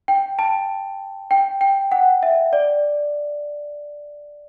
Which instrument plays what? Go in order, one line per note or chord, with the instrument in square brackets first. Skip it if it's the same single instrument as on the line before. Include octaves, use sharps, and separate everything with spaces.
[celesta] G5
A5
G5
G5
F#5
E5
D5